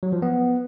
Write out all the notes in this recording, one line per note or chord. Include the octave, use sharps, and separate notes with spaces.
F#3
F3
B3